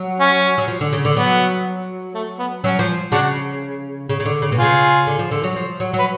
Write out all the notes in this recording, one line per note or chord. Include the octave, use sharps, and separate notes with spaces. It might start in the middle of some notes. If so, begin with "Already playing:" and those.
Already playing: F#3
C#4
F#3
F3
D3
C#3
D3
F#3 B3
A3
B3
F#3 C#4
F3
C#3 D4 F#4
C#3
C#3
D3
C#3
B2
C#3 F4 G#4
D3
F3
D3
F#3
F3
F#3
F#3
B4